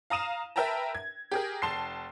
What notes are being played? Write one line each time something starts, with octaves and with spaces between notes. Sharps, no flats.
F5 A#5 D#6 D#7 E7
A#4 B4 E5 G5 A5 A#5
G#6
G4 G#4 A#4
F1 A5 C6 C7